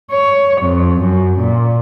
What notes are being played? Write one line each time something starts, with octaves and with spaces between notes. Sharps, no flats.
C#5
F2
F#2
A#2